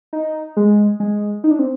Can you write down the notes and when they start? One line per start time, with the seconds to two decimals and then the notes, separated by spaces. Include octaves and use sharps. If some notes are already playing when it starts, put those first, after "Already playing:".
0.13 D#4
0.57 G#3
1.00 G#3
1.44 D#4
1.51 D4
1.59 C4